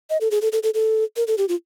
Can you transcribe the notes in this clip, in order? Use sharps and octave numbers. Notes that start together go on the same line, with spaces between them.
D#5
A4
G#4
A4
A4
A4
A4
A#4
A4
G4
F4